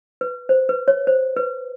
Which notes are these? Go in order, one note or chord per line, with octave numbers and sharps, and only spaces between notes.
B4
C5
B4
C#5
C5
B4